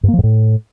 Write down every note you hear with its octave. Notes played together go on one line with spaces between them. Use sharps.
G2
A#3
F3
G#2
A2